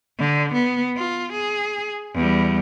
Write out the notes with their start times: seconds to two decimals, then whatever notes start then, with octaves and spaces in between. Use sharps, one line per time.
0.19 D3
0.54 B3
0.97 F4
1.33 G#4
2.15 E2 G3